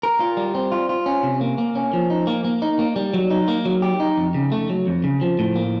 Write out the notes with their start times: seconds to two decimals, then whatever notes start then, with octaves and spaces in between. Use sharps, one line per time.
0.03 A#4
0.20 F4
0.37 G3
0.55 C4
0.72 F4
0.89 F4
1.06 C#4
1.23 C3
1.41 A#3
1.58 A#3
1.75 C#4
1.93 F3
2.10 D#4
2.27 A#3
2.45 A#3
2.62 D#4
2.79 A#3
2.96 G3
3.14 F#3
3.31 D#4
3.48 A#3
3.65 F#3
3.82 G4
4.00 D#4
4.17 F2
4.34 C#3
4.52 A3
4.70 F#3
4.87 F2
5.04 C#3
5.21 F3
5.39 A2
5.56 A#3